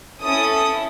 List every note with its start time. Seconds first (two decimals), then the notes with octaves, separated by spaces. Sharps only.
0.23 C#4 E4 A4 D#6